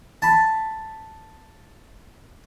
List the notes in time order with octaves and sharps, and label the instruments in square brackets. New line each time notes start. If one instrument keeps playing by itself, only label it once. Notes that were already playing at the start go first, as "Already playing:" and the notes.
[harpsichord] A5 B5